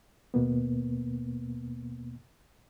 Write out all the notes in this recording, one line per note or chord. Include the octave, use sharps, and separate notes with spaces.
D#2 B2 A#3 B3